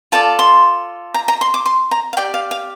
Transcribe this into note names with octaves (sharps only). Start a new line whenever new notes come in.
F4 A4 D5 A5
C6
A#5
A#5
C6
D6
C6
A#5
F5
G4 D5 G5
F5
F5